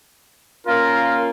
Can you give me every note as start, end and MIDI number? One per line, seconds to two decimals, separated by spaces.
0.67 1.30 58
0.67 1.30 61
0.67 1.30 65
0.67 1.18 70